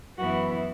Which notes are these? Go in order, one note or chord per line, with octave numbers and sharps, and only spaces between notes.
F#2 E3 B3 E4 F#4